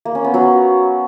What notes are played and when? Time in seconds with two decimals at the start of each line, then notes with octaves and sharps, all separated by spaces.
0.05 A#3
0.15 C#4
0.24 B3
0.34 F#3